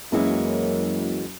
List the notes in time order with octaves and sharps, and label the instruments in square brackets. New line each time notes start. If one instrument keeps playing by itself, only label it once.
[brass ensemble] F#2 [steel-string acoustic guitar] E3 G#3 F#4 [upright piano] A#3 E4